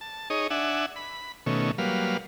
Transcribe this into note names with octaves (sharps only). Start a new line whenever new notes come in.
A5
D#4 G#4 C#5 D#5
D4 E5 F#5 G#5
B5
B2 D#3 A3 C#4
F#3 G3 A#3 B4 F5